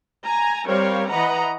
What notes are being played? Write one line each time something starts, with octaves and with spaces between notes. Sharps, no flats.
G#5 A#5
G3 C4 A#4 C#5 F5
E3 B4 D#5 F#5 A#5